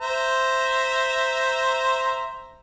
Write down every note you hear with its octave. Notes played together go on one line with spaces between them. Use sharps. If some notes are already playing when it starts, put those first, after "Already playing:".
C5 E5 A#5